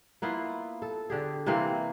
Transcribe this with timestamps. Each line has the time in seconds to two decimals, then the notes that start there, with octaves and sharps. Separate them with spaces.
0.22 A#3 B3 E4 F4
0.82 A4
1.10 D3 G4 G#4
1.46 C3 E3 A#3 C4